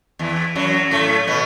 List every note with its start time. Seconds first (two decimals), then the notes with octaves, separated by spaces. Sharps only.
0.19 E2 E3
0.55 F#2 F#3
0.91 A2 A3
1.27 B2 B3